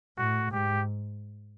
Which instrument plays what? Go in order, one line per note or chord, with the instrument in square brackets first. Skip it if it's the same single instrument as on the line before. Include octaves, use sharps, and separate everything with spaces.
[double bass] A2 [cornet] F#4
[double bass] G#2 [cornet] G4